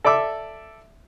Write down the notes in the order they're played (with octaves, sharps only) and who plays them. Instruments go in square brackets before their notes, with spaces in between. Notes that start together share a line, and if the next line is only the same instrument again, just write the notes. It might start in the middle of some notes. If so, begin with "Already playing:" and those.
[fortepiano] A4 D5 E5 D6 E6